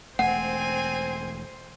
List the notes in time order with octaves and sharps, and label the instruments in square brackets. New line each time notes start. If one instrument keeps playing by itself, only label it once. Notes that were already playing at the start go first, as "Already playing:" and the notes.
[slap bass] E1 A3 [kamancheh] C4 G#5 [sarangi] C5 [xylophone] F#5